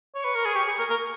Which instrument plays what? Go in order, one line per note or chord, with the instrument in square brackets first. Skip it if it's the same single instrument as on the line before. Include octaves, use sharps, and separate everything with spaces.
[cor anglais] C#5
[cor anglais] B4 [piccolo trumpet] C#6
[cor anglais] A#4
G#4
[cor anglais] G4 [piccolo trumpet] C#6
[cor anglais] G#4
A#4
A#4